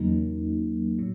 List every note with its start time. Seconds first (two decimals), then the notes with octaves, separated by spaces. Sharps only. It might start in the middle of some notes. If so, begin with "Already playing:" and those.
Already playing: E2 C#3 F#3 A#3 D#4
0.98 A2 F#3